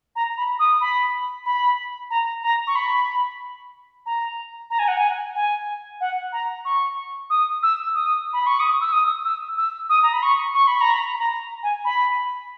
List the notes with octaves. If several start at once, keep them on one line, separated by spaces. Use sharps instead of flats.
A#5
B5
D#6
B5
B5
A#5
A#5
C#6
B5
A#5
A#5
G#5
F#5
G#5
G#5
F#5
A#5
C#6
D#6
E6
D#6
B5
C#6
D#6
E6
D#6
E6
E6
D#6
A#5
B5
C#6
C#6
B5
A#5
B5
A#5
G#5
B5